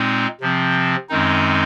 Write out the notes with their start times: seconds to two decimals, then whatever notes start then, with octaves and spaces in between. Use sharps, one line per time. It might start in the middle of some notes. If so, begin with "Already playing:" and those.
Already playing: A#2 G#3 C4 D#4
0.41 C3 F3 C4
1.09 F#2 D#3 G#3 C4 D#4